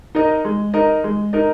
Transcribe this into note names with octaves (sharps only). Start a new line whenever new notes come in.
D#4 A#4 D#5
G#3
D#4 A#4 D#5
G#3
D#4 A#4 D#5